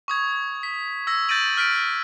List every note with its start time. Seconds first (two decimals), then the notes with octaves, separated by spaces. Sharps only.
0.08 C#6 D#6 G#6
0.63 B6
1.07 E6 G#6 A#6
1.29 G6 A6 A#6 D7 D#7 F#7
1.57 F6 B6 D7